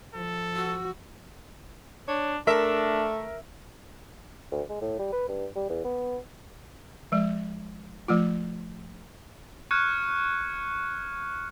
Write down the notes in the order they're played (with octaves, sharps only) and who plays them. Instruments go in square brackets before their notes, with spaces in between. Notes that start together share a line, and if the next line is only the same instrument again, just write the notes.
[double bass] F3 [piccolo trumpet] A4
[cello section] F#4 [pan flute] E6
[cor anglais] D4 [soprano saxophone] C#5
[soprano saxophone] A3 [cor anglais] D4 [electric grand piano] A#4 [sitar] E5
[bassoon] D2
G#3
A2
G3
B4
G2
G3
E2
B3
[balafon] F3 G#3
F3 A3 F4
[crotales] C#6 F6 F#6 G#6 C#7 D#7